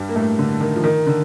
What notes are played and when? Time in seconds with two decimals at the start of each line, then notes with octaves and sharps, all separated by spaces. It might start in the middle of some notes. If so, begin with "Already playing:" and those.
Already playing: G2 G3
0.09 A#3
0.15 A2 A3
0.39 D3
0.61 D#3
0.76 F3
0.84 D#3
1.07 D3